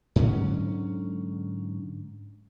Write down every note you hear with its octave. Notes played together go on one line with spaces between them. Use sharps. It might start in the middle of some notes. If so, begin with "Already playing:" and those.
G#2 D3 F#3 C#4